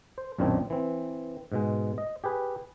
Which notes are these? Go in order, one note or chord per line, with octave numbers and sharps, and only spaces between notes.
C5
B1 F#2 A#2 D#3 C4 D4
E3 C4
G#2 B2 G#3
D#5
G4 G#4 B4